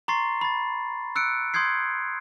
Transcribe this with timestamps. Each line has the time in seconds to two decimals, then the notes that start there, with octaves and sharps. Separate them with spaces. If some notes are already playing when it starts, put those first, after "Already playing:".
0.08 A#5 C6 C#6 A6 C7
0.41 B5 A6
1.16 E6 F#6 C#7 D7
1.54 C6 D#6 G6 G#6 C7